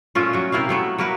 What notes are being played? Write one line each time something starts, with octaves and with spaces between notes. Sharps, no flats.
A#2 A3 C#4 F4
F#3 F#4
C3 A#3 E4 F5
F#3 A3 B3
F#3 A#3 A#4 B4